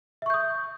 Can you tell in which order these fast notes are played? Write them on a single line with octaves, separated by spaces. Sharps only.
E5 C#6 G6 D#6